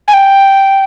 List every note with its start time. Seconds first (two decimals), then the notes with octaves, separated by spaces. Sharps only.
0.08 G#5
0.13 G5